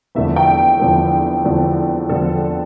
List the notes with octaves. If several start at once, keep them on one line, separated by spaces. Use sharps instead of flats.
E2 D3 F3 A3 E5
G5
E2 D3 F3 A3
E2 D3 F3 A3
E2 D3 F3 A3 A4